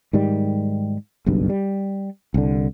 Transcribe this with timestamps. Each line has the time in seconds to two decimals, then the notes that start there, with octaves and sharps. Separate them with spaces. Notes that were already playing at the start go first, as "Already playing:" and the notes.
0.13 G#2 D#3 G3
1.26 F#1 B1 G2
1.50 G3
2.34 C2 D3